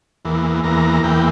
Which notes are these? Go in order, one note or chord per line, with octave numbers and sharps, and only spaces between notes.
E2 E3 A#3
E2 E3 A#3 A#5
E2 E3 A#3 G5